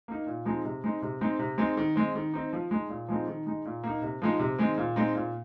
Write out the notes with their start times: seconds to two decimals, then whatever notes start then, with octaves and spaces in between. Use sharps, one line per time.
0.08 A#3 D#4
0.26 A#2
0.45 F3 G#3 C4 D#4
0.65 C3
0.84 G#3 C4 D#4
1.02 C3
1.21 G#3 C4 D#4
1.39 C3
1.58 G#3 C4 D#4
1.77 D#3
1.96 G#3 C4
2.15 D#3
2.34 C4 D#4
2.53 F3
2.71 G#3 D#4
2.89 A#2
3.09 F3 G#3 C4 D#4
3.27 D#3
3.46 G#3 D#4
3.65 A#2
3.84 A#3 D#4
4.02 C3
4.22 F3 G#3 D#4
4.39 C3
4.59 D#3 G#3 C4
4.78 A#2
4.96 G#3 C4 D#4
5.15 A#2